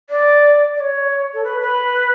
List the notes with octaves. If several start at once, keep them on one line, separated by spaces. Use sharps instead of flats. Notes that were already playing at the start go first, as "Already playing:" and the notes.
D5
D5
C#5
A4
B4
B4